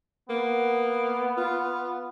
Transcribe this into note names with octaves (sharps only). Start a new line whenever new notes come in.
A#3 B3
F4